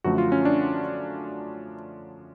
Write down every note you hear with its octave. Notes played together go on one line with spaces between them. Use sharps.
F#2 D3 F3 A3 F#4
F4
C#4
D4